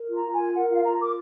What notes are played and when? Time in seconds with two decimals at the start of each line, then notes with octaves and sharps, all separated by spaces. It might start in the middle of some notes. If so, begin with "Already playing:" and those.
Already playing: A#4
0.09 F4
0.14 A#5
0.24 F4
0.34 A#4 G#5
0.54 A#4 F#5
0.70 F4 F5
0.84 F4 A#5
1.00 A#4 D6